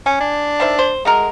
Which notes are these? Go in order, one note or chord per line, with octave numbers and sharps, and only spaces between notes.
C#4 G#5
D4
D#3 C5 E5
C5
G#3 A3 F#4 A#4